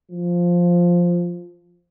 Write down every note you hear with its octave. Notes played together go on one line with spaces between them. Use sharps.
F3